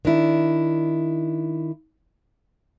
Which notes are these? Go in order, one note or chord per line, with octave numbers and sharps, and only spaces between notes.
D#3 D4 E4